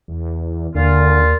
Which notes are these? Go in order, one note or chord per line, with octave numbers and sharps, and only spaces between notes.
E2
D#2 A#2 D3 F4